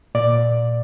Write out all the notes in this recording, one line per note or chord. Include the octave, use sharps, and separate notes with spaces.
A#2 D5